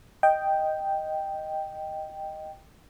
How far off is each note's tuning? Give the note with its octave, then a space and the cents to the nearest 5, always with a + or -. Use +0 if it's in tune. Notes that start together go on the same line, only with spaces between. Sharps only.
D#5 +0 G5 +0